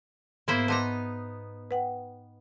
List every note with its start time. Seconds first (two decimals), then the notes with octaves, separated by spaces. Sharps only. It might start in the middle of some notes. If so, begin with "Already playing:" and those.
0.48 G#2 A#3 B3 E4 C5 G#6
0.68 B3 D#4 A5 A#5 C6 D6
1.71 B4 F#5 G5